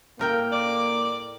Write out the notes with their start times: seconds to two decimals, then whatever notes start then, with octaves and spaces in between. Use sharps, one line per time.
0.19 A2 A#3 A#4 G5
0.52 D5 D6